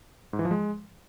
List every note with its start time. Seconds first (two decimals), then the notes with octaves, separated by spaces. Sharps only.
0.33 G#2
0.39 E3
0.45 F3
0.51 G#3